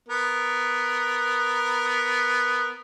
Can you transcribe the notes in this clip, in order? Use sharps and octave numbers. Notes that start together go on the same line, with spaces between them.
B3 A#4